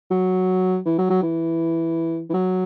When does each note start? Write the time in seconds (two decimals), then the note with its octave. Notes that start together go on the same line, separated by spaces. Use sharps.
0.11 F#3
0.85 E3
0.98 F#3
1.10 F#3
1.22 E3
2.30 E3
2.33 F#3